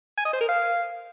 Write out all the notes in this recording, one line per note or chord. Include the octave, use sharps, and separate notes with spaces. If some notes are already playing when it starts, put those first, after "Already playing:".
G#5
D#5
C5
A#4
F5